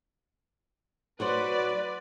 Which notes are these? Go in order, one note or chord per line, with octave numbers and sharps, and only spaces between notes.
F#3 F#4 B4 C5 D5